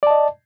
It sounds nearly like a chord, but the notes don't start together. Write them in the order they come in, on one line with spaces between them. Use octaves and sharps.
D5 A5 D#5